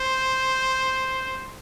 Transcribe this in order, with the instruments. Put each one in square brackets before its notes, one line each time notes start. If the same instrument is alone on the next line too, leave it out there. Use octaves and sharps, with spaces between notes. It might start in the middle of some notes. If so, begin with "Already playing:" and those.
Already playing: [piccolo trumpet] C5